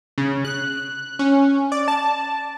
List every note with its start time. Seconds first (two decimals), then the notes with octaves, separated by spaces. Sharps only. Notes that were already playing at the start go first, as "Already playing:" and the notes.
0.18 C#3
0.45 F#6
1.19 C#4
1.72 D5
1.88 A5